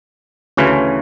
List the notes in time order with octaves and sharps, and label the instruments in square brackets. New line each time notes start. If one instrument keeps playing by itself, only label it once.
[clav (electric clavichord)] D2 C#3 E3 C#4